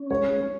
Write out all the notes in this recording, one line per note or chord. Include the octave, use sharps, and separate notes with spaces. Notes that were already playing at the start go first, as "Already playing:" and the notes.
Already playing: C#4
G#3 C#5